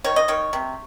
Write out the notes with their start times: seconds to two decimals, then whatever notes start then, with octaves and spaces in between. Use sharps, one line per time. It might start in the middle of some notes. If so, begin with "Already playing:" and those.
0.04 D#3 C#5
0.16 D#5
0.28 D#3 C#5
0.53 C3